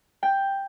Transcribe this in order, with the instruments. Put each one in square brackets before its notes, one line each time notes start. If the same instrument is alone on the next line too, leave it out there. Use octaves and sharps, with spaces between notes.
[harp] G5